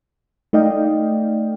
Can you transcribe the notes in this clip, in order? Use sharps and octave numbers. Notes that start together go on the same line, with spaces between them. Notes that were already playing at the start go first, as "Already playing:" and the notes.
A3 D#4 D5 D#5 F5 G5